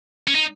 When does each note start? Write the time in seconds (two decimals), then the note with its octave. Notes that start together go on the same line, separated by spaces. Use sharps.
0.28 C#4
0.35 D#4